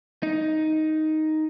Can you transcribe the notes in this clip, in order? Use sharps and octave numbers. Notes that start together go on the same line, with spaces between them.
D#4